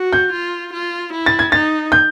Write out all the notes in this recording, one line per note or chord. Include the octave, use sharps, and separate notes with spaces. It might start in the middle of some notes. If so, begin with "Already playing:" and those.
Already playing: F#4
G6
F4
F4
E4
A6
G#6
D#4 A6
G6